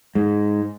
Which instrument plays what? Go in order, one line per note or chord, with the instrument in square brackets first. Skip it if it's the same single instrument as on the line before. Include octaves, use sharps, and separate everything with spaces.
[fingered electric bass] G#2